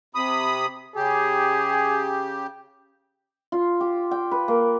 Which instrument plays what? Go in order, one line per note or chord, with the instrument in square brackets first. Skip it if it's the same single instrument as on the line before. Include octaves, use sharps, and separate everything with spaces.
[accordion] C3 B5 D#6
[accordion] C#3 G4 [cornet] G#4
[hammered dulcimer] F4
G4
G5
B4
A#3